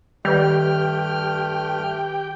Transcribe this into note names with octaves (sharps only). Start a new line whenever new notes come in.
G2 D#3 G3 A3 G4 B4 G5 F6